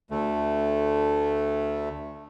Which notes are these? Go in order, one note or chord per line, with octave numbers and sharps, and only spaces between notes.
D2 A3